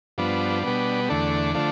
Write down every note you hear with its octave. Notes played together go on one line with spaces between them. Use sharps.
G2 F3 B3 D4
B2 G3 B3
E2 D3 A3 D4
D3 F3 A3